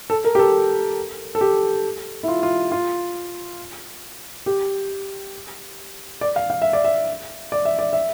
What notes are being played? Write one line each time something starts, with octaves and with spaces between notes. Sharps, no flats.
A4
A#4
G4
A4
A4
G4
E4
F4
F4
F4
G4
D5
F5
F5
E5
D5
E5
D5
E5
D5
E5